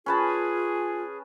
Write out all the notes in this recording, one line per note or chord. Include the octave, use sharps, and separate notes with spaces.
C#4 F4 G#4 B4 A5